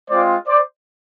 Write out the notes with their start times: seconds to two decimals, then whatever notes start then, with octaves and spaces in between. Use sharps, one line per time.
0.10 G#3 C4 F4 C5 D5
0.47 C5 D5